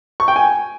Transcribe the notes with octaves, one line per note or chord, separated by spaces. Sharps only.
C#6
G5
G#5